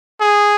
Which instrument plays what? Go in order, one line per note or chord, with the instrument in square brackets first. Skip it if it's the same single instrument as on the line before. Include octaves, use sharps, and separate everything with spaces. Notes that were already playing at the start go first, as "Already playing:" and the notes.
[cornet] G#4